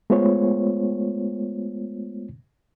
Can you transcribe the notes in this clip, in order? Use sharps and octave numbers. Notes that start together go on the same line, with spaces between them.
G#3 A3 B3 F4 C5 C#5